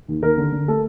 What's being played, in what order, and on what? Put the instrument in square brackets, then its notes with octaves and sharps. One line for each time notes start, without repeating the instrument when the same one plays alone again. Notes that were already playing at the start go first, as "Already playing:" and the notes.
[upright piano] D#2
D#2 A#4
D3
D3
A3 A4